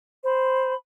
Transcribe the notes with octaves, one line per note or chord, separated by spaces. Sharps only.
C5 B5